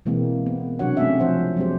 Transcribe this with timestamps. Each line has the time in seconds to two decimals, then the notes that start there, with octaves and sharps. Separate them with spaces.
0.05 B2 E3 G#3 A#3 C4
0.46 B3
0.79 C3 F#3 D4 F#4 C#5 F#5
0.97 G#3 A3 C4 C#4 E5
1.20 F3 C5 F#5
1.56 F#3 G#3 C4 G4 C5